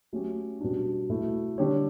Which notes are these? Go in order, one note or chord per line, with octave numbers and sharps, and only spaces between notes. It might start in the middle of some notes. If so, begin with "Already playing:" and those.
F#3 A3 C#4 G4
B2 G3 D4
B2 A3 E4 A4
D3 G3 D4 G4 C#5